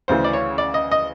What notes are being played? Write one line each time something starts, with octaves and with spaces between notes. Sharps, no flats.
D2 C#3 E3 C5
D5
C#5
D5
D#5
D#5